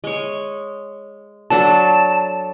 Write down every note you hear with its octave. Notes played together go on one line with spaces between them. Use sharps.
G#3 C#5
F#3 D4 A4 A5